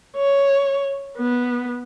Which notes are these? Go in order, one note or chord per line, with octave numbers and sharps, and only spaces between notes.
C#5
B3